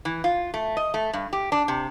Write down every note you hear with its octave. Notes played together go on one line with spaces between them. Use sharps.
E3
F4
A3
D#5
A3
G2
G4
D4
C3